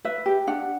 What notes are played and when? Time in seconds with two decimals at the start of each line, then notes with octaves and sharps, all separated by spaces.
0.05 B4 E5
0.26 G4
0.47 D4 F#5